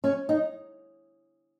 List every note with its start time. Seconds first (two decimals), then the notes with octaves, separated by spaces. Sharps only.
0.04 C#4
0.29 D#4